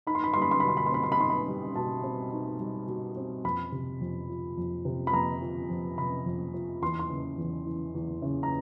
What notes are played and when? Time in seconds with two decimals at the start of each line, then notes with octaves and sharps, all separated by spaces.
0.07 D#4 B5
0.15 C6
0.24 B5
0.34 G3 C6
0.42 B5
0.51 C6
0.60 B2 B5
0.69 C6
0.77 B5
0.86 C6
0.91 C4 B5
1.03 C6
1.12 B5
1.19 D#4 C6
1.30 B5
1.48 G3
1.76 B2 A5
2.04 C4
2.32 D#4
2.59 G3
2.88 B2
3.17 C4
3.44 F2 B5
3.72 C3
4.01 F2
4.29 F3
4.58 F2
4.85 C3
5.07 B5
5.13 F2 A#5
5.42 F3
5.70 F2
5.98 C3 B5
6.26 F2
6.54 F3
6.82 E2 C6
6.99 C6
7.10 C#3
7.38 E2
7.66 E3
7.95 E2
8.22 C#3
8.43 A#5